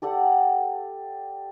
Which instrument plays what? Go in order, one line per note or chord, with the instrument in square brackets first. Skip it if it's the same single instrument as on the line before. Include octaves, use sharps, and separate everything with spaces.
[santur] G4 A4 D5 F#5